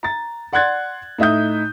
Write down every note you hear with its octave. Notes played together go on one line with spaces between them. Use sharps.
A#5 A6
D5 F#5 C6 F#6 G#6 A6
A2 D#4 E5 D#6 G6